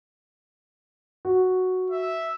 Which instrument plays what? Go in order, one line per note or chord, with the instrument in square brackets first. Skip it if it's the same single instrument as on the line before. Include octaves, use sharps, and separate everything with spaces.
[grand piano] F#4
[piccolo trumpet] E5